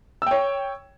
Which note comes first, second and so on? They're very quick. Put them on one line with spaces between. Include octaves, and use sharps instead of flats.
E6 G5 C#5